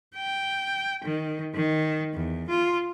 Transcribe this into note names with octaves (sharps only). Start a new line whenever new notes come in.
G5
D#3
D#3
E2
F4